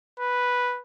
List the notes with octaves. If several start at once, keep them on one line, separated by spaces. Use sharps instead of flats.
B4